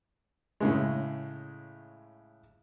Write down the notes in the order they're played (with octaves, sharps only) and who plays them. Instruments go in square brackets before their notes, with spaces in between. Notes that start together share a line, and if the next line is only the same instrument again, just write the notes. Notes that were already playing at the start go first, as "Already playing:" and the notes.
[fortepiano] A2 C#3 G#3